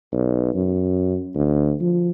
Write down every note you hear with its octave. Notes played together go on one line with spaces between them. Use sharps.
B1
F#2
D2
F3